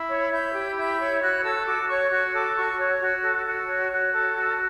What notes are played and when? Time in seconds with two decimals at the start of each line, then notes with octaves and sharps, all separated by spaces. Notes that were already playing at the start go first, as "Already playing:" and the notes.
Already playing: E4
0.09 C#5
0.31 E4 G6
0.54 G4
0.77 E4 G6
0.99 C#5
1.21 F#4 F#6
1.43 A4 E6
1.66 F#4 D6
1.89 C#5 C#6
2.11 F#4 C#6
2.33 A4 D6
2.56 F#4 C#6
2.78 C#5
3.01 F#4
3.23 A4
3.45 F#4
3.68 C#5
3.90 F#4
4.13 A4
4.35 F#4